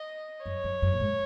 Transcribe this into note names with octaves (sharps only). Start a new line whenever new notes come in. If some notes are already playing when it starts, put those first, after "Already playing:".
Already playing: D#5
F#2 C#5
F#2
F#2
A#2
G#2